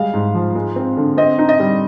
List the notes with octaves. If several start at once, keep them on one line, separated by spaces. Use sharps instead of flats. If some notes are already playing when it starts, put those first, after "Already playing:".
Already playing: G3 G#3 F5
G#2
F3
G#3
C4
D3
C4 D#5
D#4
D#5
G3